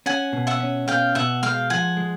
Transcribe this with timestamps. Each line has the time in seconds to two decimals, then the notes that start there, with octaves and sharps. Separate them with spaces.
0.06 C#4 F#5 G#5
0.33 B2
0.47 E5 F#5
0.60 C#4
0.87 B2 F5 G5
1.15 B2 E5 F#5
1.43 G#3 F5 G5
1.70 F3 F#5 G#5
1.97 G#3